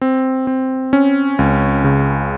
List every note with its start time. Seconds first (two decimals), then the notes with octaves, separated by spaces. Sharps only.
0.01 C4
0.47 C4
0.93 C#4
1.39 C#2
1.84 C#3